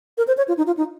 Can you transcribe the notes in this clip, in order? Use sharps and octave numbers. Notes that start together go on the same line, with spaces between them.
A#4
C5
C#5
F4
D#4
F4
D#4